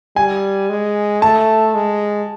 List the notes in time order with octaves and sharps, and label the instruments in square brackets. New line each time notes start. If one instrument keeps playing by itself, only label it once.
[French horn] G3 [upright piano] G#5
[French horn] G#3
[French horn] A3 [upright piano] A5
[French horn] G#3